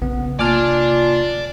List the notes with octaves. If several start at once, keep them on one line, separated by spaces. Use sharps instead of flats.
A#1 C#3 B3 C4
C3 A#3 F4 D5 G#5 A5 D6 F6